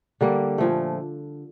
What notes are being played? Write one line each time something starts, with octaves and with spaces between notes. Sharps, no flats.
D3 G3 A#3
A#2 F3 A3